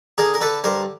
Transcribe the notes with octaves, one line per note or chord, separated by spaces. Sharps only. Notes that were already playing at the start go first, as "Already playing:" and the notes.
D3 G#4 A#4
A#4
D3 A4 B4
G2 A#4 C5